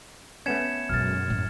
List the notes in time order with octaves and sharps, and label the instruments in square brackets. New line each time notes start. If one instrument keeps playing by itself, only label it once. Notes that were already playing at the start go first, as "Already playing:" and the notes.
[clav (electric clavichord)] A3 B3 C#4 [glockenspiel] G#6 C#7 E7
[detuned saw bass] F#2 [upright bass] B2 G#3 [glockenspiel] F6 A6
[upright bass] A2 A3